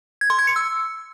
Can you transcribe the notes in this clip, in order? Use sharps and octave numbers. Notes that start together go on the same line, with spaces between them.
G#6
C6
G#6
C#7
E6